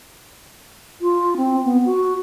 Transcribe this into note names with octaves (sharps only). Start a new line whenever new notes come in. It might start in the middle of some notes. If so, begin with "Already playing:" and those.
F4
C4
B3
F#4